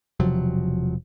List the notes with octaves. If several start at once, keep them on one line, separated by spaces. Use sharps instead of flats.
E1 C3 F3 F#3